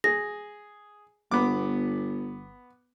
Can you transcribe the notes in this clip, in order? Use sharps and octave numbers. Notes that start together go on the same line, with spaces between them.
G#4 A#6
G1 B3 D6